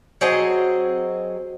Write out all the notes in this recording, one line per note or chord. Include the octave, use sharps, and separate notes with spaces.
F#3 C4 G#4 D#5